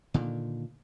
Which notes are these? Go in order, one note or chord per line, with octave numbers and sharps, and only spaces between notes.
A#2 D3 D#3